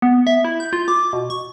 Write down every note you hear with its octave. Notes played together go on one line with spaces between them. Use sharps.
B3
E5
E4
G6
F4
D6
B2
C#6